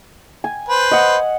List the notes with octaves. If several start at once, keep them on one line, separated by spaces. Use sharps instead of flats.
G#5
B4 C5
D#5 F#5